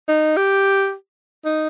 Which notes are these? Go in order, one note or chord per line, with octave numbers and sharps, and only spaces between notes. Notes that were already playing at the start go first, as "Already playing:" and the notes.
D#4
G4
D#4